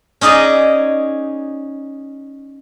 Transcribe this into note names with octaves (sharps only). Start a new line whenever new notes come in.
C#4 D#4 G#4 D5 D#5